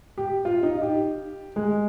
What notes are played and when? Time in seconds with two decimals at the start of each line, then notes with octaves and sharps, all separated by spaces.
0.18 G4
0.45 F4
0.63 D#4
0.82 G4
1.56 G#3